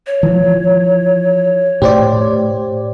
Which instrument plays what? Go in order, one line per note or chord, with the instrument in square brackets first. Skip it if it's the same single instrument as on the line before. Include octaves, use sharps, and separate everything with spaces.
[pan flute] C#5
[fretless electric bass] E3 F3
[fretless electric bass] A2 [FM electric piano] G4 C5 D5